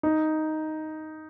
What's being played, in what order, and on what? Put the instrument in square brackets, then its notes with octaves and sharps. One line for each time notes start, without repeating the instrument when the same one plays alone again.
[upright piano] D#4